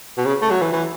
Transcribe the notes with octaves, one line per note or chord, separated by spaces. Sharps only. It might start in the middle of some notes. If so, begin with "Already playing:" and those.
B2
C#3
A3
F#3
E3
E3